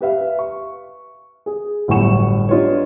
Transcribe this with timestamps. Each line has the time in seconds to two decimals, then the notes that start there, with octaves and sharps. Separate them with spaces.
0.01 G4 B4 E5 F5
0.39 C#6
1.46 G#4
1.88 G1 A2 F#3 G#5 C#6 E7
2.49 D4 D#4 F4 G4 B4 C#5